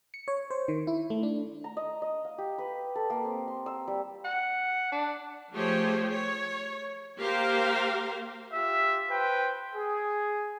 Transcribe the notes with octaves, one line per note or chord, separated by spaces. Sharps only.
C#7
C#5
C5
D#3
E4
A3
D4
A#5
D#5
D#5
F5
G4
B4
A4
A#3
C4
C6
E6
G3
F#5
D4
F3 A3 G4 G#4 C5 C#5
C#5
A#3 G4 A#4 C5 F5
F4 G4 E5
B4 C5 G5
G#4